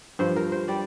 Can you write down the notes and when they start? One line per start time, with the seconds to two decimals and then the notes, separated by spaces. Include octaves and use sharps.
0.19 G2 F3 C5
0.36 A#4
0.52 C5
0.68 G3 D5